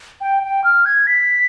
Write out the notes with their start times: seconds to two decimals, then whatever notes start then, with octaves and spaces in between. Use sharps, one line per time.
0.21 G5
0.43 G5
0.64 F6
0.85 G#6
1.07 B6